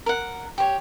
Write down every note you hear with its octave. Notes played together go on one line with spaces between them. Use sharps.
A#4 F#5
G4 C#5